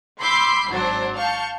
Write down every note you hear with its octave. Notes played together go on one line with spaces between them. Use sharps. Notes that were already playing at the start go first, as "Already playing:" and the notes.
B5 C6 D6 E6 G6 C7
G#1 F#3 D4 F#4 C5
F5 A5 C#6 G6 C#7